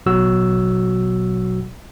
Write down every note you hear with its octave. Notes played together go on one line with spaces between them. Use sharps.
A1 B2 F#3 F#4 E6